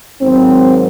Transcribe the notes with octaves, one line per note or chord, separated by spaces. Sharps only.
G#2 D#3 F#3 C4